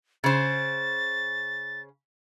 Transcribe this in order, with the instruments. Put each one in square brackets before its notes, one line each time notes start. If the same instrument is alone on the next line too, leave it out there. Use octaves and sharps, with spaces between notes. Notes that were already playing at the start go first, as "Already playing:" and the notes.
[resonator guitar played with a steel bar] C#3 C5 [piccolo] A6